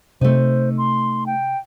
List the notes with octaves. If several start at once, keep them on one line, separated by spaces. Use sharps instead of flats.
C3 A3 D#4 C5
C6
G5